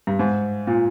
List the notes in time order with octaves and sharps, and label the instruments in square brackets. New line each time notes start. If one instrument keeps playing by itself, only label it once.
[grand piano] G2
G#2
A#2